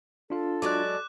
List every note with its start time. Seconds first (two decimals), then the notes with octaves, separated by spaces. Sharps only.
0.30 D4 F4 A4 F5
0.62 F#3 G#3 D5 D6 F#6